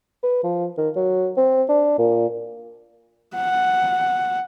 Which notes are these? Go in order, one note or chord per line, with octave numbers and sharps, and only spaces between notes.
B4
F3
D#3
F#3
C4
D4
A#2
F#5